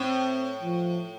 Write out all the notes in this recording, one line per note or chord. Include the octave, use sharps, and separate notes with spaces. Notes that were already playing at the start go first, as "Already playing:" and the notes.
Already playing: A2 C4
F3